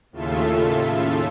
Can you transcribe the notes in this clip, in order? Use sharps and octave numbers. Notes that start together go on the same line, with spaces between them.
D#2 A2 C#3 F4 A4 E5